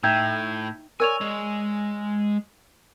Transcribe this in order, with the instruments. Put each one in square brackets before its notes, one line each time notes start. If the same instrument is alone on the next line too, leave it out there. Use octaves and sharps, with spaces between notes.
[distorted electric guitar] A2 [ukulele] D#4 E5 G5 [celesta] E6 G6 G#6
[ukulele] A#4 C#5 D5 [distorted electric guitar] G#5 [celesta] E6 F7
[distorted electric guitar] G#3